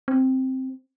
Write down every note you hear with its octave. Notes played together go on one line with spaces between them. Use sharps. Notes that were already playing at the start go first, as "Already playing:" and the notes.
C4